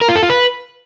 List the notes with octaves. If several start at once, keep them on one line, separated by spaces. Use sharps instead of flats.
A#4
F4
A4
F4
B4